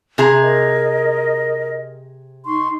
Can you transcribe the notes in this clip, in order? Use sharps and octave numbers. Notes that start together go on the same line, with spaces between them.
C3 G#4 A#5
A#4 D#5
D#4 C6 C#6